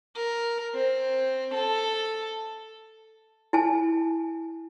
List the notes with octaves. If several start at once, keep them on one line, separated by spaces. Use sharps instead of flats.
A#4
C4
A4
E4 G#5 A5